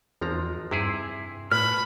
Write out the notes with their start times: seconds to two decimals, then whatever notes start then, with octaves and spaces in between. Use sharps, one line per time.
0.21 G#1 E2 F3 A#5
0.71 G2 C3 E4 G#4
1.52 A2 A3 B4 B5 F6